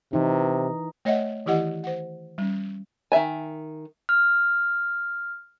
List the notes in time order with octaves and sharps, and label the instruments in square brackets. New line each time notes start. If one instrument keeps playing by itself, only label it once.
[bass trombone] C3 [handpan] E3 D#4
[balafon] A3 C#5 D#5 E5 F#5
D#3 E3 E4 G4 D#5 F#5
C5 F#5
G3 C#4
[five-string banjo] D#3 D#4 E5 G#5
[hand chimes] F6